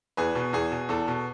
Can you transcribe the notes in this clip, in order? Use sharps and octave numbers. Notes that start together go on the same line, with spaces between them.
E2 G#4 B4
B2
E2 G#4
B2
E2 A4
B2